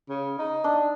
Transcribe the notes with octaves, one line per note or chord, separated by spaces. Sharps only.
C#3
D#4
D4